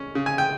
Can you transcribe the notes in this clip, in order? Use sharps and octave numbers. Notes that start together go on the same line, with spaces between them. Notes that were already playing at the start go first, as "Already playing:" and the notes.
Already playing: G#3 C#4
C#3
G#5
G5